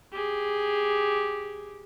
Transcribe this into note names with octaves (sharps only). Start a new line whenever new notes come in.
G4 G#4